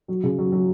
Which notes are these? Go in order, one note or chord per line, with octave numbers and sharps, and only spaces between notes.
F#3
C#3
F#3
F#3